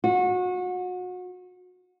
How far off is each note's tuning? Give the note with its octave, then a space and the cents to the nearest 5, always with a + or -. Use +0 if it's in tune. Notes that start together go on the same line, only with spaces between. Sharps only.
F#4 -30